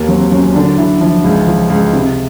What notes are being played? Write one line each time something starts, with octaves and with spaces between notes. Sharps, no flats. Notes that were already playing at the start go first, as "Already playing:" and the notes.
Already playing: D#2 A#3
F#3 C4
F#3 C#4
D3 D4
D3 E4
F3 E4
C#2
F3
C#2
C3